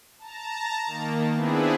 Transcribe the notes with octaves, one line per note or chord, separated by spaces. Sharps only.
A5 A#5
D#3 A#3
B3 C4 D4 E4 G#4 B4